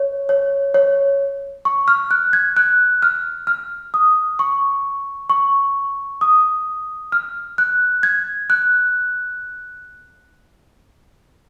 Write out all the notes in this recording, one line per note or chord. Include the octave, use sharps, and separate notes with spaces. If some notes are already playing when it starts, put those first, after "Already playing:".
Already playing: C#5
C#5
C#5
C#6
F6
F#6
G#6
F#6
F6
F6
D#6
C#6
C#6
D#6
F6
F#6
G#6
F#6